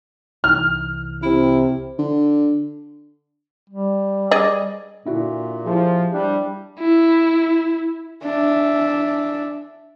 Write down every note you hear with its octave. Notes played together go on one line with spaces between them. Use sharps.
C2 E3 F6
C3 E4
D3
G3
G#4 D5 D#5
A#2 D3 E4 F#4
F3 E4 G4 G#4
G3 D4
E4
D4 E5